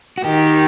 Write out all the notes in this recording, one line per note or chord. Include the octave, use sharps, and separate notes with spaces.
F#4
D#3 G4